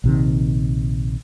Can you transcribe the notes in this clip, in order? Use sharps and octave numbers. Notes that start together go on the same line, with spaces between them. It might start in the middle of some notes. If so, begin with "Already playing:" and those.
A#1 C3 D#3